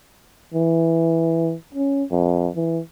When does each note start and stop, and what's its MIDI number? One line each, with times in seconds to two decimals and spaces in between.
0.54 1.55 52
1.75 2.04 61
2.12 2.49 41
2.56 2.81 52